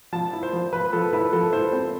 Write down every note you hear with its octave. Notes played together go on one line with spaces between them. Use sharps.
F3 A5
E4
C5
F3
F3 B4
F3 A4
E4 B4
F3 A4
E4 C5
C4